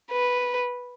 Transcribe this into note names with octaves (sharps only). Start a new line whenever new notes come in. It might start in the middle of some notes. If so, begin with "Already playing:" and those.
B4